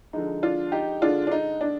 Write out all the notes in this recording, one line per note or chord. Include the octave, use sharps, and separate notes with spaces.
D3 F3 G#3 D#4
D4 F4
D#4 G4
D3 G#3 D4 F4
D4
D#4
D4